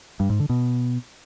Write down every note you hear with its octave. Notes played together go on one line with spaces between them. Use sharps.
G2
G#2
D3
B2